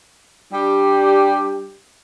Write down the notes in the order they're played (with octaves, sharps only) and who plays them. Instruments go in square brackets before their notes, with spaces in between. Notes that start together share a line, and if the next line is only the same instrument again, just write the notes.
[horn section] G3 D4 G4